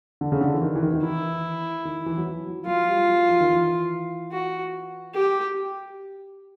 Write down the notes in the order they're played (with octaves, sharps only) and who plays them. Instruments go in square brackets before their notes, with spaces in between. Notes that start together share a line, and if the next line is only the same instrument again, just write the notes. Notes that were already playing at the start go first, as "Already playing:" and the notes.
[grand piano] D3
C#3
D3
E3
D#3
E3
D#3
D#3
[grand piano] E3 [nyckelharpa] E4
[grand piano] D#3
E3
F#3
F3
F#3
[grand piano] F#3 [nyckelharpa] F4
[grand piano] G3
F#3
F3
D#3
E3
[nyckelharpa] F#4
G4